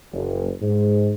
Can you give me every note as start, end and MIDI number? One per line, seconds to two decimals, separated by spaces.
0.13 0.51 30
0.62 1.13 44